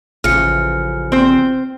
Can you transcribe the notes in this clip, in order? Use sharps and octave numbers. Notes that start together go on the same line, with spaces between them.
A1 C#3 F3 F6 C#7
C4 C5